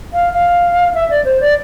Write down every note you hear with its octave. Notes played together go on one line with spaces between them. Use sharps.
F5
F5
E5
D5
C5
D5